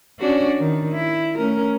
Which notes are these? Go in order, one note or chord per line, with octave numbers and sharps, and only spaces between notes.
C#4 D4 F#4
D#3
E4
A3 C#4 A#4